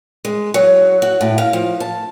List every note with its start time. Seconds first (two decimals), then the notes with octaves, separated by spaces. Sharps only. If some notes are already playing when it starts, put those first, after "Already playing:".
0.25 G#3
0.54 F#3
1.02 F#4
1.21 A2
1.38 F5
1.53 F3
1.80 A5